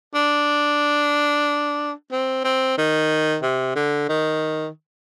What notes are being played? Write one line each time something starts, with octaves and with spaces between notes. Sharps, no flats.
D4
C4
C4
D#3
C3
D3
D#3